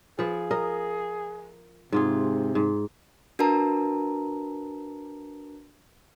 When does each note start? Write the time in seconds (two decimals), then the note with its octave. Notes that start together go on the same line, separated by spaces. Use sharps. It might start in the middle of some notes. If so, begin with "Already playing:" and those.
0.19 F3 G#4 B4
0.51 A#4 D#5
1.92 G#2 C3 F4 G#4
2.55 G#2
3.39 D4 F#4 A#4 B4 A5 A#5